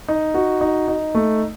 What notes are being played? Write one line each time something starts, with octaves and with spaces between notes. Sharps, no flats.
D#4
F#4
D#4
D#4
A3